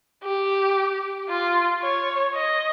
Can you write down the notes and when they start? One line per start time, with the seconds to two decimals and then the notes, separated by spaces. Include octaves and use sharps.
0.24 G4
1.29 F4
1.82 C#5
2.35 D#5